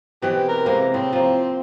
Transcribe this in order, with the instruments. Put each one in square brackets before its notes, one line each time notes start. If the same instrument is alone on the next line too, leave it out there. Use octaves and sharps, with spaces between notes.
[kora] B2 E3 C4 [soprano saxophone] G4
[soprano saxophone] A#4
[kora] C3 G#3 A#3
[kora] A2 [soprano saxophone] C4
[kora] F3 A#3